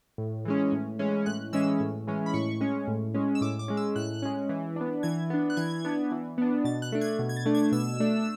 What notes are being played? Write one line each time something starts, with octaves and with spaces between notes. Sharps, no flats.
A2
E3 G#3 C#4
A2
E3 G#3 C#4
A2 F#6
E3 G#3 C#4 E6
A2
E3 G#3 C#4
B5
A2 C#6
G#3 C#4
A2
G#3 C#4
E6
A2 D6
D6
G#3 C#4
E6
A2 F#6
G#3 C#4
E3
B3 D4
E3 G#6
B3 D4
F#6
E3 G#6
B3 D4
E3
B3 D4
B2 A6
F#6
A3 D4
G#6
B2
G#6
A6
A3 D4
G#6
B2 E6
A3 D4